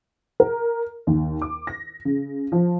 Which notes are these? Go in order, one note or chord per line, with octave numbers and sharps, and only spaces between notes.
A#4
D#2
D6
A#6
C#3
F3